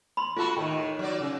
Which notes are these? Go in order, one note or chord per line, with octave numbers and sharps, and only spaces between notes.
B5 C6
A3 F4 F#4 A4
D#2 A2 D#3 G5
F#3 D5
C#3